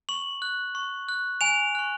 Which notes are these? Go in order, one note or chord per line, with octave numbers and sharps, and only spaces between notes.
C#6 F#7
F#6
C#6
F#6
G#5 F7
C#6 F#6